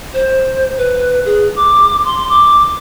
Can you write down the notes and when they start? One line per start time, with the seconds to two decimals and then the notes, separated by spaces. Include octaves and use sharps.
0.14 C5
0.78 B4
1.25 G#4
1.56 D6
2.05 C6
2.30 D6